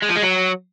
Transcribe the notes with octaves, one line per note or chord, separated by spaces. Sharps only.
G#3
F3
G#3
F#3